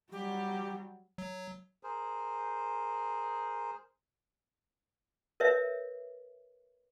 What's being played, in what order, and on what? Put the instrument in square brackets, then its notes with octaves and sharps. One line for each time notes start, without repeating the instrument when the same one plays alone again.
[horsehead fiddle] F#3 G3 [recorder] G4
[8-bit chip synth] F#3
[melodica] G#4 A#4 C5
[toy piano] A#4 B4 C#5 E5